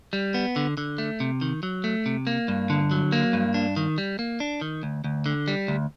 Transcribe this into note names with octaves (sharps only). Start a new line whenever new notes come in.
G3
B3
D3
D3
A3
C3
D#3
F#3
A3
C3
A#3
G2
D3
F#3
A#3
G2
D4
D#3
G3
A#3
D4
D#3
D2
D2
D3
G3
D2